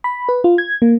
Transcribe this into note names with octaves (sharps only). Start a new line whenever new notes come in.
B5
B4
F4
G#6
A#3